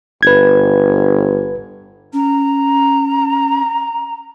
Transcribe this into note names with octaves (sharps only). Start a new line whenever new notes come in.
G1 B4 G#6
C#4 A#5